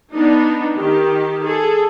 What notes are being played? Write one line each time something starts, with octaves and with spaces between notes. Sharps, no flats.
B3 D4 D#4
D#3 G4
G#4 A4